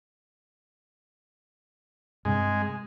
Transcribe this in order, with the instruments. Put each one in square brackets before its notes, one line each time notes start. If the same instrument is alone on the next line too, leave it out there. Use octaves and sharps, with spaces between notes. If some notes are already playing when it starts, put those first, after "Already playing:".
[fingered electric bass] G2 C3 [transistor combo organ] G#3